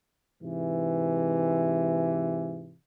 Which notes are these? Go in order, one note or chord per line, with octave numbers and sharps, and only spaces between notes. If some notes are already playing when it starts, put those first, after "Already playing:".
G#2 C3 E3